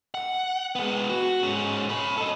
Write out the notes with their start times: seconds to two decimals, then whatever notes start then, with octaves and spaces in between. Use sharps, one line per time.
0.15 F#5
0.75 G#3 B3
1.10 F#4
1.43 G#2 C#4
1.89 C#5 B5
2.17 A4 D#5